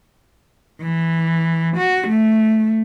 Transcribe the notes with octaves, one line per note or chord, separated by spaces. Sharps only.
E3
F#4
A3